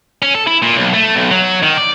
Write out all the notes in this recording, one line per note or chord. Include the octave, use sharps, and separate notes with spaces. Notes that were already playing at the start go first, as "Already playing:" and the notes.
C#4
A4
E4
A#2
B1
A3
B1
F#3
D#3
D5